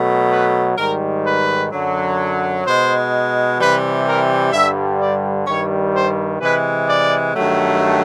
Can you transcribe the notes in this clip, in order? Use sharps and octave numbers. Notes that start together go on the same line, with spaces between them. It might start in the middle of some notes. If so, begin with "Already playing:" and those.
Already playing: B2 F#3 A3
B4
G#2 D#3 G3 A#4
B4
F#2 D3 F#3
B2 G#3 C5
C3 E3 G3 B4
A#4
G2 D3 G3 E5
D5
G2 D#3 G3 C#5
C5
C3 E3 G#3 B4
D5
G2 D#3 F#3 A3